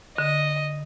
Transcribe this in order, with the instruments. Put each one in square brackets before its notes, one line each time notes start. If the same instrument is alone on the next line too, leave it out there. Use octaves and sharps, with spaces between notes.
[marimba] D3 [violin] D#5